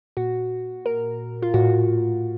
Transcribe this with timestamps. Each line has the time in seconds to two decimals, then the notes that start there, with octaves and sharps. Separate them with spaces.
0.17 A#2 F#4
0.85 A#2 A#4
1.42 F4
1.54 A2 F#4